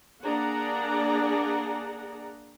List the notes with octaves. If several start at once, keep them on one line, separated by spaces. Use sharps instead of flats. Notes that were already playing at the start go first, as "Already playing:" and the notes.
A#3 D4 G#4 D5 F#5 A#5